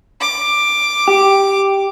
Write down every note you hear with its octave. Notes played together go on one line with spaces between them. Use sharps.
D6
G4